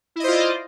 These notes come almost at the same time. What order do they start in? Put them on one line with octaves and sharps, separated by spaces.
E4 D#5 C5 F4 D5